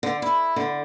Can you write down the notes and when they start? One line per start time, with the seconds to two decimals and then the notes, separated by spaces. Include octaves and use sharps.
0.03 D3
0.22 E4
0.56 D3